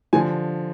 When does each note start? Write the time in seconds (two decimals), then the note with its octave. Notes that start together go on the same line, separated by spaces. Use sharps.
0.13 D3 F3 G#5